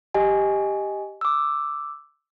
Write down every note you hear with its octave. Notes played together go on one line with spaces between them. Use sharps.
G4 D#5 G#5
D6 E6